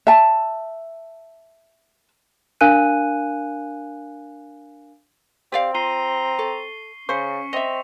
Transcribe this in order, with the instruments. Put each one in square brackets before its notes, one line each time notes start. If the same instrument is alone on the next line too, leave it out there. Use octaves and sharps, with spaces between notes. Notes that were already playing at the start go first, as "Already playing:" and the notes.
[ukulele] E5 A5
[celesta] D4 A#4 F5 G#5 F#6 D#7
[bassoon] C4 [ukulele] G4 D5 F5
[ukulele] F4 [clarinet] A#5 [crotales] C7 D#7 G7
[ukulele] A4 [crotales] C#6
[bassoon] C#3 [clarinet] C#4 [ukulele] C5 [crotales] C#6 B6 C#7
[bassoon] C4 [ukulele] D#5 E5 [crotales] A#6 F7